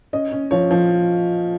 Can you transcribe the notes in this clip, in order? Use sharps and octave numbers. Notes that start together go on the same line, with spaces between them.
C#4 D#5
C#4
F3 C#5
F3